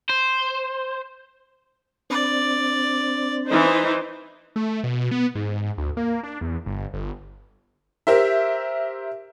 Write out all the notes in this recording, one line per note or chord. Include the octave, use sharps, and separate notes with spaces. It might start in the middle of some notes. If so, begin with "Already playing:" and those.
C5
C4 D4 D5
E3 D#4 C5
A3
B2
B3
G#2
D2
A#3
D4
E2
G1
G1
G4 A#4 C5 E5